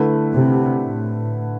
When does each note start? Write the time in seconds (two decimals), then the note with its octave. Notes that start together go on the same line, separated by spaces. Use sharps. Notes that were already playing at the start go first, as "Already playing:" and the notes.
Already playing: D3 A3 E4 B4
0.32 C3
0.79 A2